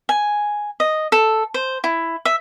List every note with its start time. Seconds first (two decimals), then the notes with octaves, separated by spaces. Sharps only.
0.09 G#5
0.80 D#5
1.12 A4
1.54 C5
1.84 E4
2.25 E5